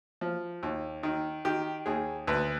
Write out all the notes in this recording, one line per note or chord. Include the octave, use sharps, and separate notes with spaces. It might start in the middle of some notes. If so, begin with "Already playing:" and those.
F3
D#2
D#3
D#3 G4
D#2 G#4
D2 B4